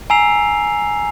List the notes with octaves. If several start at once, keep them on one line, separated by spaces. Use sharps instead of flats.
G#5 A#5 E6 C7 F7